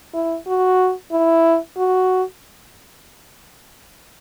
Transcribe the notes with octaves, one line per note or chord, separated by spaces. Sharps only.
E4
F#4
E4
F#4